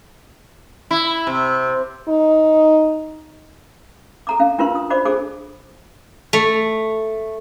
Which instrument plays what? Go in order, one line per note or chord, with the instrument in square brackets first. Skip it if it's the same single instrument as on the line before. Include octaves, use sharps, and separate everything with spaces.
[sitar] E4
C3
[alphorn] D#4
[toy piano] A4 A#5 D6
C#4 F5
C#4 D4 F4 A#4 B4 C6
D#6
F#4 C5 D5 B5 D6
D4 G#4 A4 C5 D6
[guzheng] A3